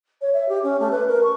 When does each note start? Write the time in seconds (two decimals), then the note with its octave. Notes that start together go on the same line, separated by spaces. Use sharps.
0.21 C#5
0.33 E5
0.49 G4
0.63 C#4
0.80 A3
0.91 B4
1.07 A#4
1.23 C#6